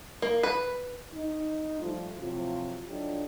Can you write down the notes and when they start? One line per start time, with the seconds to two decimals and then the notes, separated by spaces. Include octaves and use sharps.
0.22 A#3
0.43 B4
1.14 D#4
1.80 F3 G3 A3 F4
2.19 A2 C3 F3 F#3 F4
2.87 D3 F#3 D4 D#4 F4 G4